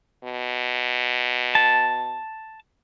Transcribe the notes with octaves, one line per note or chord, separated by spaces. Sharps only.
B2
A5